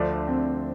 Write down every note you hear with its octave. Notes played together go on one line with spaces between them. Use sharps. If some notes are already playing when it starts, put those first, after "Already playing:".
Already playing: D2 D3 F3 A3 D4
C4